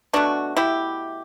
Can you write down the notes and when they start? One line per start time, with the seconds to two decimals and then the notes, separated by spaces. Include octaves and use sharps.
0.13 B2 A3 D4 F#4
0.57 E4 G4